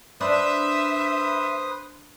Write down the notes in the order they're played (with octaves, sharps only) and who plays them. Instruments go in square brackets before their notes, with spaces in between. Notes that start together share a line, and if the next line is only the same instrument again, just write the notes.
[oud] D4 [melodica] B4 C5 D#6 [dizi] E5